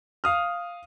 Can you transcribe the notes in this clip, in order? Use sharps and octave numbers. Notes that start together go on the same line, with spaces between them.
F5 D#6 F6